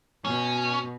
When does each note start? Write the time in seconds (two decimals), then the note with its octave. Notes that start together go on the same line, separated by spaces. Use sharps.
0.24 B2 C#4